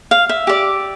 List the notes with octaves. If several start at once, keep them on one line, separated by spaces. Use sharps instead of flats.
F5
E5
G4 D5